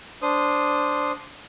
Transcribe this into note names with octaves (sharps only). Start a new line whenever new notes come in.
D4 C5 D#6